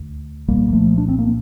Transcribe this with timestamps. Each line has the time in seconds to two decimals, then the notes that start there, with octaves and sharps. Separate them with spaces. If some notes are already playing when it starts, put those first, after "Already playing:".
Already playing: D2 D3
0.48 C2 A#2 G3 A#3
0.68 G3
0.73 F3 A3
0.98 D4
1.08 C4
1.19 A#3